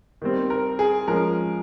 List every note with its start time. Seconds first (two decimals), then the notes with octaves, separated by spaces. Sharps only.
0.22 D#3 G3 C4
0.50 A#4
0.79 G#4
1.08 F3 G#3 C#4 G#4 A#4